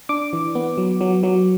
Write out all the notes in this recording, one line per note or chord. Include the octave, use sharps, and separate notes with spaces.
D4 D6
E3
B3
F#3
F#3
F#3